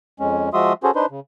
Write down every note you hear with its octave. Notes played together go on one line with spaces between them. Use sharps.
F2 G#3 C#4
F3 G#3 F#4 E5 C6 D#6
C#4 F#4 G#4 A4 C5
D4 D#4 B4 C5 C6
C#3